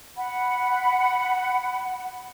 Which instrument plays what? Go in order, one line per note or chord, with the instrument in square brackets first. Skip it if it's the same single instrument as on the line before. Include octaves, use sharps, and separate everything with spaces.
[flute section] F#5 B5